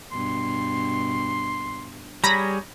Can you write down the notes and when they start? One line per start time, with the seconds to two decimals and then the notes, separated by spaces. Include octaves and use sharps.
0.12 G2 B2 C6
2.24 G3 G#4 C#5 A#5 B5 A#6